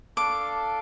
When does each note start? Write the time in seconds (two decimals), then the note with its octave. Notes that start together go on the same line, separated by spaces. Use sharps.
0.17 D4 A4 F5 D6